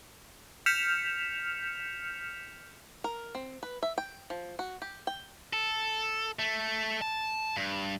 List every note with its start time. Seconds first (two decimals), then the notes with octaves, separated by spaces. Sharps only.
0.66 F6 G6 B6 C#7 E7 F7
3.04 A#4
3.35 C4
3.63 B4
3.83 E5
3.98 G5
4.30 F3
4.59 F#4
4.82 G4
5.07 G5
5.53 A4
6.39 A3
7.01 A5
7.57 G2